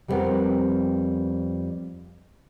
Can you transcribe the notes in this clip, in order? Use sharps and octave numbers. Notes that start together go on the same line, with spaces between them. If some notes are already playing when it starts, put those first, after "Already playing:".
F2 G3 A3 B3 C4 A#4